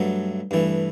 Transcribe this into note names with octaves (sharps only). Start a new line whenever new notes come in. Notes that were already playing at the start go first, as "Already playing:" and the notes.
Already playing: G2 F#3 A3
G2 E3 A3